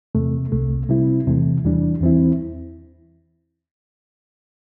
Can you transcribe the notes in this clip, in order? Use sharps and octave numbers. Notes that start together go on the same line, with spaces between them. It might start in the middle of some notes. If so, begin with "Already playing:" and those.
E2 C3 A3
C2 C3 A3
C3 G3 C4 E4
E2 C3 E3 A3
E2 E3 G3 D4
E2 E3 C4 E4